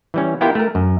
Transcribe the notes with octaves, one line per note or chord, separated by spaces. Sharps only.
E3 G3 C#4
B3 E4 F4 G4 A#4 G5
A3 A#4
F#2